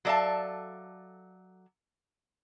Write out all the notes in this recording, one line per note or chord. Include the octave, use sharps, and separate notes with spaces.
F#3 A4 D5 E5 F5 A5